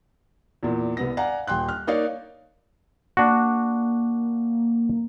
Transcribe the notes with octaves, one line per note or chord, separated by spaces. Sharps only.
E2 A#2
C2 B3 A#6
D5 F5 F#5 G#5 A#5
D#1 G5 C6 F#6
F6
A#3 D#4 C#5 D5 F5
A#3 D4 F#4